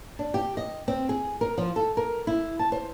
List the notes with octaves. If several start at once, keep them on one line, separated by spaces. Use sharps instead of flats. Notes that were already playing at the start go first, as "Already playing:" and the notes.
D4
G4
D#5
C4
G#4
A#4
F3
A4
A#4
E4
A5
C5